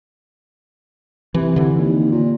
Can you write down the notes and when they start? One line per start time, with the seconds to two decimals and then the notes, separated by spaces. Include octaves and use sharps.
1.35 C3 E3
1.56 D3 E3
1.78 D#2
2.11 A#2